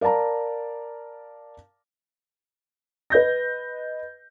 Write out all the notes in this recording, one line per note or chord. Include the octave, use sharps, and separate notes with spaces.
A#4 D5 F5 A5 A#5
B4 D#5 G6 A#6